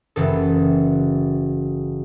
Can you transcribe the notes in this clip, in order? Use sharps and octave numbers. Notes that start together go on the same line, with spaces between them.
F#1 E3 A4